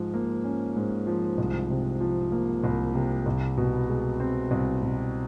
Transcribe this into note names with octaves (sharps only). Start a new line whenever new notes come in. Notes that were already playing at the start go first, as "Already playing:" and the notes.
Already playing: G#2 F3
A#3
C#4
G#2
F3
C2
C3
F3
A#3
C2
C3
C2
B2
G#3
C4
C2
B2